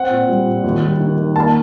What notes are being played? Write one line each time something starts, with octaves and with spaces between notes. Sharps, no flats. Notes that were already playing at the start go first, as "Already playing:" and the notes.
Already playing: C4 F#5
A#2
G3
A#2
D#2
G3
D#3
D#3
A#3 A5